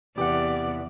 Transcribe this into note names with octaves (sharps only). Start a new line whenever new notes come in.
E2 C3 E3 G4 D5 F#5 D6